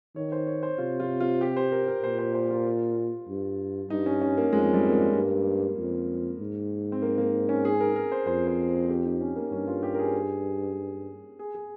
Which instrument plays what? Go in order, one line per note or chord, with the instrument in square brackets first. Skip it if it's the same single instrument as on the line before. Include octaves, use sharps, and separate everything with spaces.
[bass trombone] D#3 [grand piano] C#5
[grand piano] C5
C#5
C5
[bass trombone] C3 [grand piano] F4
[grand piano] F4
F4
G4
C5
A#4
A#4
[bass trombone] A#2 [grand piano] C5
[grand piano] C5
C5
F4
[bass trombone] G2
[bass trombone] G2 [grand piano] D#4
[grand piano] C#4
C#4
A#3
[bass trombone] F2 [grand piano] G#3
[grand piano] G3
A#3
G#3
[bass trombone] G2 [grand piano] A#3
[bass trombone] F2
G#2
[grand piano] C4
A#3
A#3
C#4
G#4
A#4
A#4
C5
[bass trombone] F2 [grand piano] C5
[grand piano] C5
G4
D#4
C#4
A#3
[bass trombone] G2 [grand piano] C#4
[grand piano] F4
G4
A#4
G#4
G#4
G#4